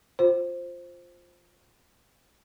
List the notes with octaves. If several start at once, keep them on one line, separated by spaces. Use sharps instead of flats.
F4 C5